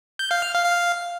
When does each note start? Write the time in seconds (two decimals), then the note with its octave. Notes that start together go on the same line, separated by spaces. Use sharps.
0.19 G6
0.31 F5
0.42 F6
0.54 F5
0.65 F5